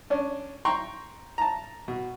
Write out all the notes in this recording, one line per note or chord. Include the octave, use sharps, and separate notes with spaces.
C#4 D4
G5 A#5 C6 C#6
A5 A#5
B2